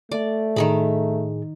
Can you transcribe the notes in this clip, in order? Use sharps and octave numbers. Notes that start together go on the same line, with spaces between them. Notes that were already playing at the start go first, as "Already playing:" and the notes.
A3 D5
A2 D#3 G#4 A#4 B5